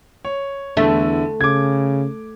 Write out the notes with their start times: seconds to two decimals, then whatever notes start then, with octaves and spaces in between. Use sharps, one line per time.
0.25 C#5
0.77 E2 D3 A3 E4
1.41 C#3 D6 G#6